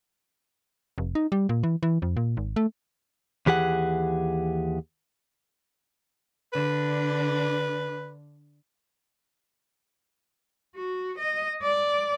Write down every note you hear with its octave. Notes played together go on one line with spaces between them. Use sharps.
F1
D#4
G3
A#2
E3
E3
F2
A#2
G#1
A3
D#2 E3 G4 G#4 F#5
D3 D4 B4
F#4
D#5
D5